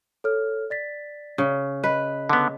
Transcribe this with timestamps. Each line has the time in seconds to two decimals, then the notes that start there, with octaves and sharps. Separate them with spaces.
0.24 A4 C#5 F6
0.70 D5 A6 B6
1.38 C#3
1.84 B4 D#5
2.29 D3 B3